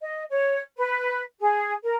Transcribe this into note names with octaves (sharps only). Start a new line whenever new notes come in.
D#5
C#5
B4
G#4
A#4